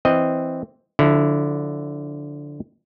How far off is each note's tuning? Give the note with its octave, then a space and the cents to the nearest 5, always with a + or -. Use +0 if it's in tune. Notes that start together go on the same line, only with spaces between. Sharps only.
E3 +0 C4 +0 D#5 +0
D3 -5 F3 +25 E4 +0